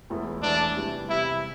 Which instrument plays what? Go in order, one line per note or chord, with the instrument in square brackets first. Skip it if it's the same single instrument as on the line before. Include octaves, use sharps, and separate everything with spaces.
[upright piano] E1 E2 E3 A3 E4
[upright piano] E1 E2 E3 A3 E4 [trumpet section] D4
[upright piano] C3 E3 G3
[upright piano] C3 E3 G3 [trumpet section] E4